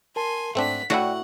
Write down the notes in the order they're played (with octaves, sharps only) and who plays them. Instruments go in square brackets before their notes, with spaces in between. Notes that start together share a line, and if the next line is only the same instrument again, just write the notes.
[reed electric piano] A#4 A5 [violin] G#5 C6
[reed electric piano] G#2 [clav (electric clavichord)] A3 C4 D4 [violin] F#5 B6
[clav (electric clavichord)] A2 A3 E4 [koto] F#4 [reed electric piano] D5 G5 [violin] F#5